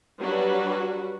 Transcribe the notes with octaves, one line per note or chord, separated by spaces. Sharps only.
F#3 G3 D4 F#4 B4